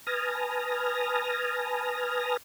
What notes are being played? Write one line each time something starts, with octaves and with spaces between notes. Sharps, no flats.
B4 G#5 A5 D#6 F6 A#6